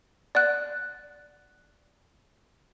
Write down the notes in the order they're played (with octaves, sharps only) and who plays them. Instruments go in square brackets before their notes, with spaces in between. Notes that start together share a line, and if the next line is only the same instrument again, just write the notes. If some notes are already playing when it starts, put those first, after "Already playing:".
[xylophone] D5 F#5 F#6